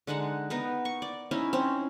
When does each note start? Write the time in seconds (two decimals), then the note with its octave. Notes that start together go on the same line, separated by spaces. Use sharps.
0.07 D3 G#3 D#4 F#5
0.50 B3 D#4 A#4
0.85 C#6
1.02 D5
1.31 C#4 D#4 E4
1.53 C4 C#4